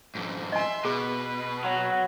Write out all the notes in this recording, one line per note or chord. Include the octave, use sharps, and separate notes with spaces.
F2 G#2
D#5 E5 G#5 C6
B2 G#4 B4
F#3 C6